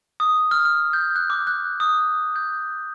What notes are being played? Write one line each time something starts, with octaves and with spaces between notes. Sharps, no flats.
D#6
F6
F6
G6
F#6
D6
F#6
D#6
G6